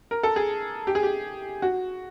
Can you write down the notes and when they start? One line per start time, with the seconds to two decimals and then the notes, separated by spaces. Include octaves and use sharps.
0.11 A#4
0.23 A4
0.36 G#4
0.87 G4
0.95 G#4
1.03 G4
1.62 F#4